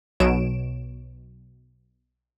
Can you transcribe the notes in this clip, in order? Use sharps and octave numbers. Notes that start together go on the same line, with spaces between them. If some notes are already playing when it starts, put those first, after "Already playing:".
B1 B2 F#3 C#5 D7 E7